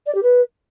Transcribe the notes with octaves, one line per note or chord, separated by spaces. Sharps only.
D5
G4
B4